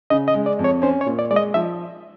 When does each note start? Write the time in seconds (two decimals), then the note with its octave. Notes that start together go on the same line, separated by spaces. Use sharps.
0.10 C#3 D#5
0.28 D#5
0.34 G#3
0.46 D5
0.59 F2
0.64 C#5
0.82 C#4 C5
1.01 C#5
1.06 A#2
1.19 D5
1.30 G#3 D5
1.36 D#5
1.54 F3 E5